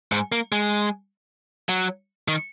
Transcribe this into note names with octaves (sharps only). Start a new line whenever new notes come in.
G#2
A#3
G#3
F#3
D#3